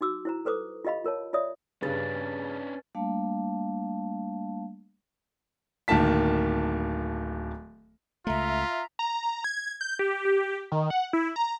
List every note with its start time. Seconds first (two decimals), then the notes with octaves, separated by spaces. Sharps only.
0.01 D#4 F#4 D6 E6
0.25 E4 C5 A#5
0.45 A4 B4 C5 D6 D#6
0.85 F4 G4 D#5 F5 B5
1.04 F4 A#4 C#5 A5
1.33 F4 C#5 D5 E5 D#6
1.82 G2 C#3 C#4 D4 B4 A6
2.95 G3 A3 A#3 D4 F5 A5
5.88 D1 D#3 A#3 A5 B6
8.27 C#2 A3 F4 E5 A#5
8.99 A#5
9.44 G#6
9.81 G6
9.99 G4
10.25 G4
10.72 D#3
10.90 F#5
11.13 E4
11.36 A#5